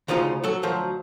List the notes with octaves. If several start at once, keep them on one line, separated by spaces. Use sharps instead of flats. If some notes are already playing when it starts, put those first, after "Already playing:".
D2 C#3 F3 D#4 F4
F#3 A4
D2 F3 F#3